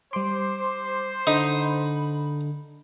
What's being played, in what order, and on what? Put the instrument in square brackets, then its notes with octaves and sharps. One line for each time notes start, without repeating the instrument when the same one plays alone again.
[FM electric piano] G3 D6 [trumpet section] C5 [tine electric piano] C6
[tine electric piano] D3 [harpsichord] D#4 [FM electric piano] B5